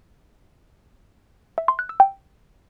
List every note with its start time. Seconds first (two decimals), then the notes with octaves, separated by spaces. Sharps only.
1.58 E5
1.68 C6
1.79 F#6
1.89 E6
2.00 G5